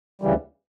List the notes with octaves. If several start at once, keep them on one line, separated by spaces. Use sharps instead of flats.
D2 C#3 E3 G3